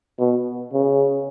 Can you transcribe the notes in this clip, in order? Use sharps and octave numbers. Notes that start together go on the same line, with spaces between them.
B2
C#3